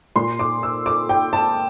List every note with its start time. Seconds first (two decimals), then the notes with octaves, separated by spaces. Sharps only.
0.16 A#2 C6
0.39 D6
0.63 E6
0.86 D6
1.09 G5
1.33 A5